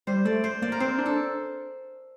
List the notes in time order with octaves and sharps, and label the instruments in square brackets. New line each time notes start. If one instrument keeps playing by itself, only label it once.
[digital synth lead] G3 [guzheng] C5
[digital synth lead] A3 [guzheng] D5
[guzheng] C5
[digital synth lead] A#3 [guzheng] D5
[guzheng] A#4
[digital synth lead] C4 [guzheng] C5
[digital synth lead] D4
[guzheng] A4